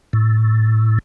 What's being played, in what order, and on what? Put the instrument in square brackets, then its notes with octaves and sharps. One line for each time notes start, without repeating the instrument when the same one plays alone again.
[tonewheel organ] A2